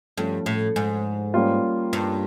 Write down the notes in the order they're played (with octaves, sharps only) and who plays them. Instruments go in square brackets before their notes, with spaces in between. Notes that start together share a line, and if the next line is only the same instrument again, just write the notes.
[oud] G2 [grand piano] F3 A3 C#4
[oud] A2
G#2
[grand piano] G3 A#3 C#4 F4
[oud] G2